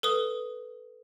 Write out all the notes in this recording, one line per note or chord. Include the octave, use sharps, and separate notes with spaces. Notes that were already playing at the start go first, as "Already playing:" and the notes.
A4 B4 D#6